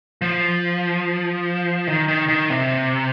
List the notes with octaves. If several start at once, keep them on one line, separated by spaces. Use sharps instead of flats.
F3
D#3
D#3
D#3
C3